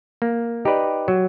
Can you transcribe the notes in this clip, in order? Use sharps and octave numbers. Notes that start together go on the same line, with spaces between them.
A#3
D#4 G4 B4 D5
F#3